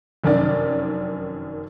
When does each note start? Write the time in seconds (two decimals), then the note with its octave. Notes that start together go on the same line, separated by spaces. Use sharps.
0.24 F1 F#2 D#3 C#4 D4 D5